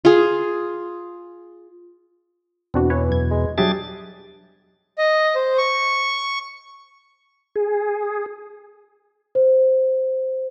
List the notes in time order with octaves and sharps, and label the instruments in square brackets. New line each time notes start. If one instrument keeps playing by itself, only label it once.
[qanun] F4 G#4
[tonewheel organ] E2 B2 [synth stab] C4 D4 F#4
[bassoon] E3 [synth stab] B4 C#5
[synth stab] F#2 G#6
[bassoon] G#3
[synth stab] F#3 G3 E5 [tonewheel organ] D4 G#4 A6 [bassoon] G4
[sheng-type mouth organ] D#5
C5
C#6
[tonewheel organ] G#4
[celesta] C5